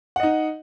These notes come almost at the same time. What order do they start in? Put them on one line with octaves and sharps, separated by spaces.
F#5 D#5 D#4